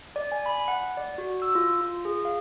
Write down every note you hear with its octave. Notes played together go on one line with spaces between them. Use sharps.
D5
G#5
B5
F#5
D5
F#4
E6
F4
F4
G#4
F5